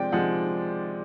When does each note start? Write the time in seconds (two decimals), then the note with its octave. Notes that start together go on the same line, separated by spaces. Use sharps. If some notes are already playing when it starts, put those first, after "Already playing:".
Already playing: C3 F3 G#3 D5 G5
0.12 C3 F3 G#3 F#5